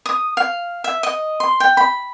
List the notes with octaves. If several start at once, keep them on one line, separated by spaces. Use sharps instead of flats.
D#6
F5
E5
D#5
C6
G5
B5